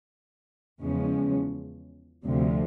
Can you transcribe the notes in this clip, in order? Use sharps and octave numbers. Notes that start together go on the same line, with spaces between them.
E2 C#3 F3 G#3 C#4
D2 C3 F3